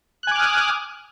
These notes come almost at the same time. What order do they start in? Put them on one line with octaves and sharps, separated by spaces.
F#6 G#5 D6 F6 D#6